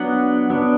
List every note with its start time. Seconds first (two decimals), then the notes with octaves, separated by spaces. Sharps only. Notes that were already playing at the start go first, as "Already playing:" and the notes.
Already playing: F#3 B3 D4 F#5
0.50 F#3 B3 D4